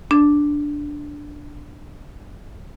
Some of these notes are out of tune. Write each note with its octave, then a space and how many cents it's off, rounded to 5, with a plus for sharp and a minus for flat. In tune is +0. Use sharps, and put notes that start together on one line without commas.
D4 +0